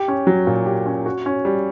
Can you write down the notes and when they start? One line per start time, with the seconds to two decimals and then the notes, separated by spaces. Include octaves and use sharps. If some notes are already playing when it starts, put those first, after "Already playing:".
Already playing: G4
0.08 C#4
0.27 F#3
0.47 A#2
0.66 G4
0.86 C#4
1.06 F#4
1.26 C#4
1.45 G3